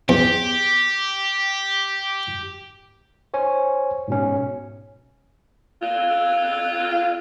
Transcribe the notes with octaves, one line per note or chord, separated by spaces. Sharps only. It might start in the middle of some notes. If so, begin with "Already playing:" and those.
E2 G4
C5 C#5 G#5
G#2 B2 C#4
F4